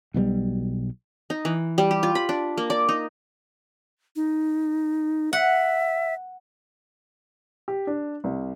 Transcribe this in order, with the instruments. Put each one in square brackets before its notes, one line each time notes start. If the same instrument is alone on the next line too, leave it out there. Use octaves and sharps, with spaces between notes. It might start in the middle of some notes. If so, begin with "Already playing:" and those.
[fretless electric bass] B1 B2 E3 G3
[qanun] D#4
E3
G3
G4
F4
B5
D4
A#3
D5
D#4
[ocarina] D#4
[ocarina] E5 [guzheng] F#5
[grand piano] G4
D4
C2